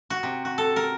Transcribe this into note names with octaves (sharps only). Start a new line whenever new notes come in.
F#4
C3
F#4
A4
A#4